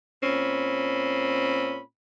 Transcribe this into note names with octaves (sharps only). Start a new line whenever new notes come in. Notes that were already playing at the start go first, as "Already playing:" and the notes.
A#2 C4 C#4 B5